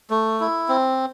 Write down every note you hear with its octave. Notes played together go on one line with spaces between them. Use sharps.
A3
E4
C4